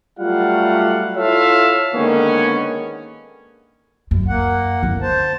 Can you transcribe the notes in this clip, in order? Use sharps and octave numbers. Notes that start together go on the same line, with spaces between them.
F#3 G3 A3 F4 F5 F#5
E4 F4 A4 C#5 E5 F5
D3 D#3 G#3 A#3 B3 C#4
F#2
A#3 F#5
D3 C#4
C5 A5